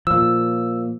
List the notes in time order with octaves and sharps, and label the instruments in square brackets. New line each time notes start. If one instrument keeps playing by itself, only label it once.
[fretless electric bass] A#2 F3 [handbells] E6